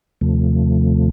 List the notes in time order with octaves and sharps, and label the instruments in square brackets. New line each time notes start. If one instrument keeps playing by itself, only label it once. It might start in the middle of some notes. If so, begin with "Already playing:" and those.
[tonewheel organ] D#2 C3 F3 A3